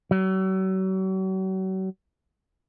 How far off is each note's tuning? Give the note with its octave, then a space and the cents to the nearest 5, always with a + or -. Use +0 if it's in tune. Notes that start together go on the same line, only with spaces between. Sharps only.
F#3 +40